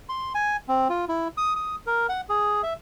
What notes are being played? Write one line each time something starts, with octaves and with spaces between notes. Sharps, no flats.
C6
G#5
C4
F4
E4
D#6
D#6
A#4
F#5
G#4
E5